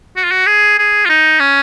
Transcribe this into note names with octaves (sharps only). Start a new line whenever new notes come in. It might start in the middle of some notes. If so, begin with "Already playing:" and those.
F#4
F4
F#4
G#4
G#4
F4
D#4
C#4